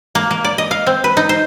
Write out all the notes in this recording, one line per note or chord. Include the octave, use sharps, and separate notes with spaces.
A#3
A#3
D5
D#5
F5
C4
B4
D#4
C5